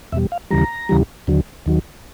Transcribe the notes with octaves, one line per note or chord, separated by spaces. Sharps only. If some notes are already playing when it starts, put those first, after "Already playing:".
E2 B2 G3 E5
F5
D#2 C#3 E3 G3 A#5
D#2 C#3 E3 G3
D#2 D3 F#3
D#2 D#3 F#3